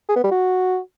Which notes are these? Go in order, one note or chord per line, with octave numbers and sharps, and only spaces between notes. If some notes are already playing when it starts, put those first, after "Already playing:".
G#4
B3
G3
F#4